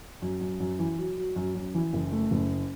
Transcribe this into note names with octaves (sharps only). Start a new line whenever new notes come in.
F#2
F#2
F#2
E3
F#3
F#3
F#2
F#2
E3
F#1
A3
F#1